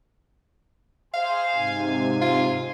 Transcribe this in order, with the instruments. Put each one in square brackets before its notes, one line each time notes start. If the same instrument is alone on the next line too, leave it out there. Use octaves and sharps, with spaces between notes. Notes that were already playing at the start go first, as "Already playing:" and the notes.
[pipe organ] G#4 C5 [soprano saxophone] F5
[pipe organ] G#2 C3 G#5
[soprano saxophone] F4